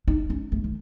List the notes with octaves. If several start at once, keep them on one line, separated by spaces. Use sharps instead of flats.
D#4
C#4
A3
D#3